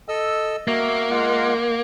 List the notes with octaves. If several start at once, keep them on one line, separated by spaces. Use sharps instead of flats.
A4 D#5 E6
A#3 F#4 E5
G#3 F4 F#5